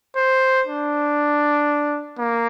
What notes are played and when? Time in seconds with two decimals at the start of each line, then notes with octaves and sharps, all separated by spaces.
0.16 C5
0.67 D4
2.18 A#3